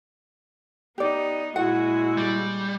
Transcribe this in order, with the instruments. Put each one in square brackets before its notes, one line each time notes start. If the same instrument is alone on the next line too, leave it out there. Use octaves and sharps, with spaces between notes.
[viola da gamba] B3 D#4 [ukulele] G4 D5
[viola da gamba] A#2 G#3 F#4 [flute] E4 [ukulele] F#5
[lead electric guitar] G3